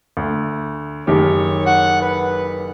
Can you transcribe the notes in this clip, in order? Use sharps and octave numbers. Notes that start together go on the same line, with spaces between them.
D2
F#1 D#3 G4 C#5
F#5
B4